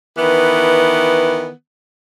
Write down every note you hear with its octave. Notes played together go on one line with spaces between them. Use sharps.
D#3 E3 B3